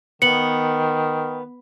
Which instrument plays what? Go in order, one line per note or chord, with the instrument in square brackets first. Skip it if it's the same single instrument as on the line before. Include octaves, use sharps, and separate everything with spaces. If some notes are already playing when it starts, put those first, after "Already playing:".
[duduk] D#3 [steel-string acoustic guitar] B3 [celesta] C#7 F#7